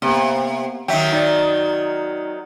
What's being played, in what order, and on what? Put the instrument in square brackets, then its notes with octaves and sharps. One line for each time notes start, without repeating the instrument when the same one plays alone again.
[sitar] C3 [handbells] A#3 B3
[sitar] D#3 F#3 [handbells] E5 G5
[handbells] D#4 D5